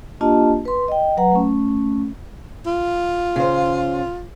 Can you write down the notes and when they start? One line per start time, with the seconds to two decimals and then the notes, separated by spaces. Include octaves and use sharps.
0.21 A#3 D4 F4 G4 D#5 A5
0.65 B4 C6
0.88 D#5 G5
1.17 F#3 B4 F#5 A#5
1.32 A3 C#4
2.66 F4
3.36 C#3 C5